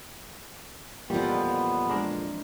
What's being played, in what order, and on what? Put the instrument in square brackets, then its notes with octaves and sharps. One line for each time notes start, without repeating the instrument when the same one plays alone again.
[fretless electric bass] F2 A#2 [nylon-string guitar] E3 F3 [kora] G3 [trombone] B3
[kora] G#3 D4 A#4